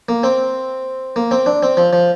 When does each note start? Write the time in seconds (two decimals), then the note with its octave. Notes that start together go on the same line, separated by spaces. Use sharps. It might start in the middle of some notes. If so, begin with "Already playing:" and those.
0.09 A#3
0.23 C4
1.16 A#3
1.31 C4
1.46 D4
1.63 C4
1.77 F3
1.93 F3